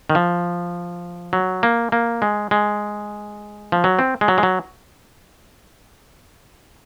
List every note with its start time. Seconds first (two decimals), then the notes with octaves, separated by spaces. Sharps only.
0.10 D#3
0.15 F3
1.33 F#3
1.63 A#3
1.92 A#3
2.22 G#3
2.51 G#3
3.72 F3
3.84 F#3
3.99 C4
4.21 G#3
4.28 F#3
4.38 G#3
4.43 F#3